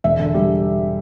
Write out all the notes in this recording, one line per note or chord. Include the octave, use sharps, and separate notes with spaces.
E1 E5
D3
G3